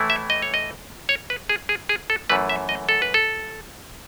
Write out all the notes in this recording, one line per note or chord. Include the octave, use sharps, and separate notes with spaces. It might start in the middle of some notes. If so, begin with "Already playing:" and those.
Already playing: A2 E3 A3 E4
E5
D#5
C#5
D#5
C#5
B4
G#4
G#4
G#4
A4
F#2 E3 A3 B4
E5
D#5
A4
B4
A4